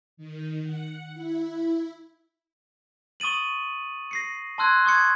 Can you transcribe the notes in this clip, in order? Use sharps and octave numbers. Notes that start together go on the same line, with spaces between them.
D#3
F#5
E4
C#6 D#6 A6 D#7 F#7
A#6 C7 C#7
A5 C6 E6 F#6 G#6
C6 C#6 D#6 G#6 C#7